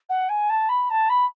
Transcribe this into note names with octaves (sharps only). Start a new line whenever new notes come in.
F#5
G#5
A5
B5
A5
B5